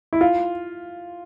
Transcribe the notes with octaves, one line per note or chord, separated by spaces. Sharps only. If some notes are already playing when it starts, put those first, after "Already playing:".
E4
F4